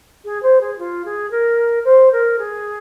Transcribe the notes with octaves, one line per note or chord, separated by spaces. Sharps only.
G#4
C5
G#4
F4
G#4
A#4
C5
A#4
G#4